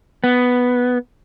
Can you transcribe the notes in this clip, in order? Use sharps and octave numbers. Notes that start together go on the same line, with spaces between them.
B3